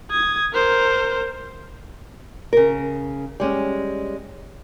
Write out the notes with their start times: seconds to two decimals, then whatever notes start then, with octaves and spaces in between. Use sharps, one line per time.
0.11 D#6 G#6
0.53 A#4 C5
2.53 C#3 A#4
3.40 G3 G#3 C#4